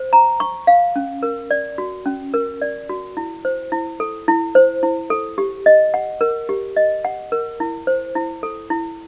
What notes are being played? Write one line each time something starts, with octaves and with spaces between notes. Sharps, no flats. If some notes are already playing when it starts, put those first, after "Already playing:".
Already playing: C5
A#5
C#6
F5
C#4
A#4
D5
F#4
C#4
A#4
D5
F#4
E4
C5
E4
A4
E4
C5
E4
A4
G4
D#5
F#5
A#4
G4
D#5
F#5
A#4
E4
C5
E4
A4
E4